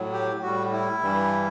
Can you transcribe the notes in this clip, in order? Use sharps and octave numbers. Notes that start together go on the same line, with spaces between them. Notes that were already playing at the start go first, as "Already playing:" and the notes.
Already playing: A2 F#3
G4
A2 G3 F#4
E4
G2 E3 G3